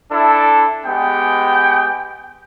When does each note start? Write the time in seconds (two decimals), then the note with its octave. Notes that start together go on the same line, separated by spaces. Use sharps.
0.11 D4 E4 A4
0.86 G#3 B3 G4 G5